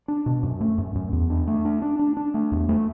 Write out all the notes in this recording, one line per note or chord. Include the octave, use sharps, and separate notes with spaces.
D4
B2
F#2
A3
F#2
F#2
E2
D4
A3
D4
D4
D4
D4
A3
E2
A3